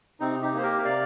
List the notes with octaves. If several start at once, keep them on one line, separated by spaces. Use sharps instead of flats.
C3 C4 D#4
D#4 G4
A#3 C5
G4 A#4
C3 D5 F5